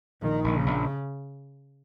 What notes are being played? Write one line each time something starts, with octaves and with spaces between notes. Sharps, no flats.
A#1 D#3
A#1
C#3
A#1